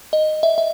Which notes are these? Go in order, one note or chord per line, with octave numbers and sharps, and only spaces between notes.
D#5
E5
E5